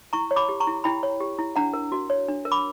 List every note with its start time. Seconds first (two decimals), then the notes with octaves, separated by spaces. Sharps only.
0.13 E4 A#5 C#6
0.31 C#5
0.36 B5 D6
0.49 G4
0.60 A#5 C#6
0.67 E4
0.84 E4 G5 B5
1.03 C#5
1.20 G4
1.39 E4
1.56 D4 F#5 A#5
1.73 A#4
1.92 F#4
2.10 C#5
2.28 D4
2.45 A#4
2.52 B5 D6